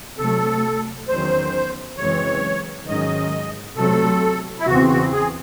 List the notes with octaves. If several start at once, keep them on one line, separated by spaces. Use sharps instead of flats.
C3 F#3 A3 A4
E2 D#3 F#3 C#4 C5
F#2 C#3 E3 G#3 C4 C#5
G#2 D#3 F#3 C#4 D#5
C3 F#3 A3 C4 A4
E4
E2 C#3 E3 C4 F#4
F#4
G#4